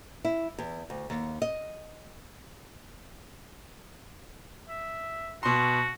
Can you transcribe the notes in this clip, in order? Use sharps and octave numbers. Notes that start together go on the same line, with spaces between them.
E4
E2
D2
D#2
D#5
E5
B2 F#4 C6